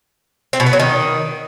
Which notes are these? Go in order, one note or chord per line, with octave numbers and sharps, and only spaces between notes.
C4
B2
B3
F#3
D#3